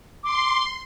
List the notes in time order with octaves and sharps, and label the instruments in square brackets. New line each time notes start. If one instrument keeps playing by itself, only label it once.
[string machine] C6 [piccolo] D6